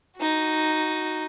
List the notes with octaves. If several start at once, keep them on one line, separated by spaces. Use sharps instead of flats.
D#4 F#4